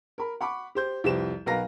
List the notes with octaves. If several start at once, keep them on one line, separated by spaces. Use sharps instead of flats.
A#4 B5
F#5 B5 C#6 D6
G4 C5 G6
C2 F2 G4 B4 C5 E7
B1 A#4 B4 F5 A#5 A#6